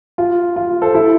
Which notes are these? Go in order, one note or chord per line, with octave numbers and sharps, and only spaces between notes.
F4
F4
A4 C5
E4